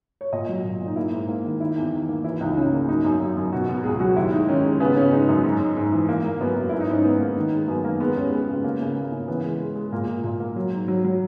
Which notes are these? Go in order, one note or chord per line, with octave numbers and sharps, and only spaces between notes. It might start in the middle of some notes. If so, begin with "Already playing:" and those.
C#5
A#2 D#5
F#3
A#2
A#2
D#4
A#3 E4
G#2
A#3
D#3
D#3 E4
E2
D#3
A#3
E3 E4
C#2 D#4
C#3 C#4
A#3
F#2 D#4
F#2
F#2
F#2
B2 F#4
B2
C#2 G#4
F#3 F#4
D#2 E4
G#3 D#4
D#3 C#4
G#3
C#3 B3
C#3 C#4
G#3 D#4
F#2
G#2
G#2
G#2
E3
A#3
A#3
F#2 B3
F#2
G#2 E4
D#4
G#2 C#4
G#2 B3
A#3
D#3
G#3
F#2 B3
D#3 A#3
G#3 B3
D#2 C#4
G#3 B3
C#3
A#3
C#3
A#3
C#3
E3 B3
G#3
G#3
G#3
A#2 A#3
A#2
A#2
A#3
F#3
G#2
F#3
F#3